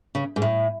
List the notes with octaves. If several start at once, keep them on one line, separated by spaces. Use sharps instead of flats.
C#3
G#2
A2